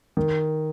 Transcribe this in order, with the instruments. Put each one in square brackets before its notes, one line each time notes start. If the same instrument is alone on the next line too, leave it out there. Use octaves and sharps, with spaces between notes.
[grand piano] D#3